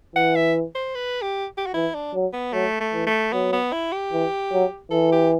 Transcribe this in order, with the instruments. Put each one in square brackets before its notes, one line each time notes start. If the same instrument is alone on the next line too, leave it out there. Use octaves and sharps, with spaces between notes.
[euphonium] E3 [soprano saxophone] F#5
[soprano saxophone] E5
C5
B4
G4
G4
F#4
[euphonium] E3 [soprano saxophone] E4
[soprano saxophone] D4
[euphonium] F#3
[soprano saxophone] B3
[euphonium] F#3 [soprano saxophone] A3
[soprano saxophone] A3
[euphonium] E3
[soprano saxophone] A3
[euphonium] F#3 [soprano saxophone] B3
[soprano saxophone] B3
E4
G4
[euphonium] E3
F#3
[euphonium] E3 [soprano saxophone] A4
[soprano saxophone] G4